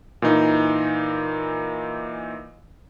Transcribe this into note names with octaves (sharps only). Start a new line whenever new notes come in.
A#2 E3 D#4